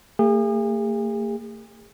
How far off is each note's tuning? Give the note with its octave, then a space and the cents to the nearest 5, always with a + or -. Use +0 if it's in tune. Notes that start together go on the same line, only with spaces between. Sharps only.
A3 +45 G#4 -40